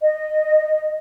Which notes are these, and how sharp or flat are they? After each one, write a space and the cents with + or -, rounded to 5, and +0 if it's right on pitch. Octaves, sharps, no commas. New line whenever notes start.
D#5 -15